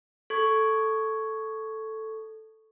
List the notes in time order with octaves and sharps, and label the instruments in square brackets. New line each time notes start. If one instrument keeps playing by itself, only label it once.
[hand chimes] A4 C#6 G#6